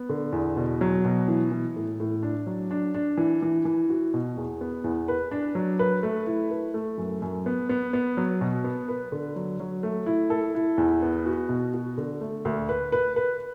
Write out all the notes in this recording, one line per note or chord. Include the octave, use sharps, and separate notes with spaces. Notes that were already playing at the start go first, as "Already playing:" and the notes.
Already playing: B3
D3
E2
B2
F#3
B2
E3
E3
A2
A2
D4
F#3
D4
D4
E3
E3
E3
F#4
B2
E2
B3
E2
B4
D4
F#3
B4
A3
E4
B4
A3
F#2
F#2
B3
B3
B3
F#3
B2
B3
B4
D3
F#3
F#3
A3
E4
A4
E4
E2
B3
F#4
B2
F#4
D3
A3
D2
B4
B4
B4